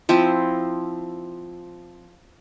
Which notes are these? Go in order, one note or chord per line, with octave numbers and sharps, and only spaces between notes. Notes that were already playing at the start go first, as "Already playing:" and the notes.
F3 C4 E4